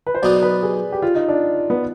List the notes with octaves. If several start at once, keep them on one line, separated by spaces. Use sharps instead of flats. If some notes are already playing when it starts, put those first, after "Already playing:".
B4
C5
B1 B2 B3 D#4 D5
B4
G#4
G4
F4
D#4
D4
B3